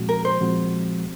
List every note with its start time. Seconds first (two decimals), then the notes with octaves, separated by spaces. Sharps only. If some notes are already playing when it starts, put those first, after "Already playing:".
Already playing: A#2 F3 G#3 C4 F#4
0.09 A#4
0.25 C5
0.41 A#2 F3 G#3 C4 F#4